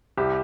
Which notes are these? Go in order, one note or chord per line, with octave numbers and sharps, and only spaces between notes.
C2 G4